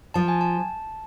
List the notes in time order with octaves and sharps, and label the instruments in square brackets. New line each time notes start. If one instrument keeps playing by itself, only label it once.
[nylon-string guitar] F3 [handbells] A5
[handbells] G#5
A5